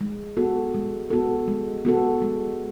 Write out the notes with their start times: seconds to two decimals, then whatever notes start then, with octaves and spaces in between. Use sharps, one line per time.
0.01 G#3
0.37 B3 F#4 A4
0.74 G#3
1.10 B3 F#4 A4
1.48 G#3
1.85 B3 F#4 A4
2.22 G#3